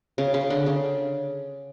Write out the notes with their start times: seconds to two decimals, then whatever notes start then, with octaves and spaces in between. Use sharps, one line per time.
0.18 C#3
0.34 C#3
0.50 D3
0.66 C#3